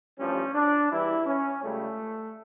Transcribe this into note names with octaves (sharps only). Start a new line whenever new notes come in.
A1 G2 F3 C#4
D4
E2 E3 G3 E4
C#4
C#2 C#3 G3 A3